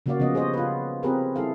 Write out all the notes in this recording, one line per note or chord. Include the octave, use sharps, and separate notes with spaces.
C#3 F#3 A#3 F#4 D5 F5
C#3 F3 B3 D#5
G3 G#4 C5 C#5 D#5
F4 B4
C4 F4 G4 G#4 A#4 B4
G3 E4 G#4 A4 F5